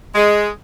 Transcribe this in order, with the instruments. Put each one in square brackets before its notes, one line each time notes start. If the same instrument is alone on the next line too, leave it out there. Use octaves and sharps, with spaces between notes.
[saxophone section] G#3